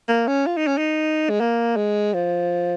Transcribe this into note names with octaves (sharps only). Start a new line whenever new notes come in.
A#3
C#4
F4
D#4
C#4
D#4
G#3
A#3
G#3
F3